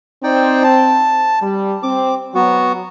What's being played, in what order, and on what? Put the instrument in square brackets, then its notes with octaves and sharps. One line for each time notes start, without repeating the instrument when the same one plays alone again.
[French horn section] C4 [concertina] D#4 D5 G5
[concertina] A5
[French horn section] G3
[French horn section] C4 [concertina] D6
[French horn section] F#3 [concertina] B3 F#4